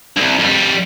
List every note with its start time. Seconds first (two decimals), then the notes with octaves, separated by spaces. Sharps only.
0.17 C2 G2
0.39 F2 G3